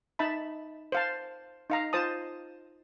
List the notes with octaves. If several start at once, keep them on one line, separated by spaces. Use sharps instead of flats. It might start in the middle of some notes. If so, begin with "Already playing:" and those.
D#4 E5 A5 B5
C5 F5 A5
D#4 F5 A#5
F4 C5 A5 D#6